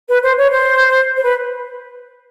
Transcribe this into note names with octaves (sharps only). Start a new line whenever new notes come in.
B4
C5
C#5
C5
C5
B4